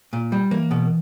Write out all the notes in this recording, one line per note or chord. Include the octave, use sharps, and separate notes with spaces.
A#2
G3
E3 A#3
B2